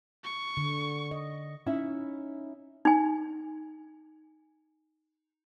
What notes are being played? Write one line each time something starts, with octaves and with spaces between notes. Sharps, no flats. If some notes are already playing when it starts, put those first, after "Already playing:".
C#6
D3
D#5
C#4 D#4 E4 E5
D#4 G#5